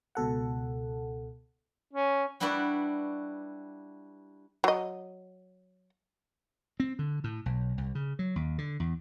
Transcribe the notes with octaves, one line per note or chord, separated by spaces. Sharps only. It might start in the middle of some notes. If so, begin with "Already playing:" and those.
C#2 B2 A4 F#5
C#4
G3 D4 E4 F#4 B4 D5
F#3 D#5
C4
D3
A2
B1
C2
C#3
F#3
D#2
D3
E2